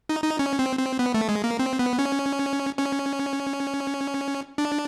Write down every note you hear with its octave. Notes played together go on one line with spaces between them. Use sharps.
D#4
D#4
C#4
C4
C4
B3
A3
G#3
A#3
C4
B3
C#4
C#4
D4